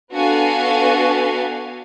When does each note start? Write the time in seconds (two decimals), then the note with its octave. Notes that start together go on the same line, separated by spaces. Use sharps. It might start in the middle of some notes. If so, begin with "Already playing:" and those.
0.13 B3 D4 F#4 A4 F5 G#5